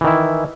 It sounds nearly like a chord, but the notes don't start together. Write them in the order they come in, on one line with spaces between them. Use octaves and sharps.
E3 D#3 E4